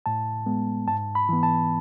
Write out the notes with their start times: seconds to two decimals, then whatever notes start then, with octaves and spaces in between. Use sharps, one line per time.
0.06 A2 A5
0.46 G#3 B3
0.88 G#2 A5
1.15 B5
1.29 E3 B3
1.43 A5